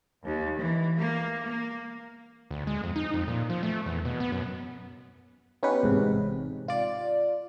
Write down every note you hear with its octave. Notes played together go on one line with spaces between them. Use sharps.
D#2
E3
A#3
A#3
D2
G#3
F2
D#4
F2
A#2
F3
A3
E2
B2
B3
F#2
B3 C#4 D#4 G4 B4 F#5
A1 G#2 C3
F4 D5